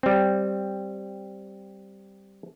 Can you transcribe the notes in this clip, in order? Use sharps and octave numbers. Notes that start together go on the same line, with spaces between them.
G3 C4